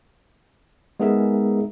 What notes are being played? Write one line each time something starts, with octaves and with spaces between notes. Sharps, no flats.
G#3 B3 D#4 G#4 A#4 E5